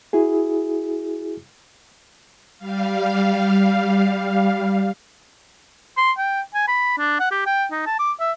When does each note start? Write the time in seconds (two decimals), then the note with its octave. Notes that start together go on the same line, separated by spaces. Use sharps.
0.13 E4 F#4 G#4
2.58 G3 F5
5.97 C6
6.18 G5
6.54 G#5
6.68 B5
6.98 D4
7.20 F#5
7.31 G4
7.46 G5
7.71 D#4
7.86 A5
7.99 D6
8.20 E5